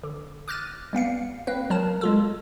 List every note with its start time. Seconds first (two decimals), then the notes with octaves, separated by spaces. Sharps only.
0.03 D3
0.48 D6 F6 F#6 A6 D#7
0.93 G3 B3 F5 C#7
1.47 A#3 C4 B4
1.70 F#3 A#4 A5 E7
2.01 G#3 F4 A4